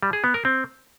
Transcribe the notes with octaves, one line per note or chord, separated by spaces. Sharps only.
G3
G#4
B3
A#4
C4